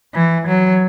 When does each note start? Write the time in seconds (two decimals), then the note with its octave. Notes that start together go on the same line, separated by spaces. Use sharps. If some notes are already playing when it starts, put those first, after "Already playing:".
0.14 E3
0.48 F#3